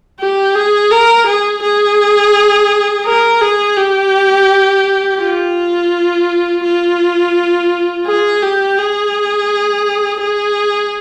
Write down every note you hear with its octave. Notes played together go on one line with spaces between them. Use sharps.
G4
G#4
A#4
G#4
G#4
A#4
G#4
G4
F4
F4
G#4
G4
G#4
G#4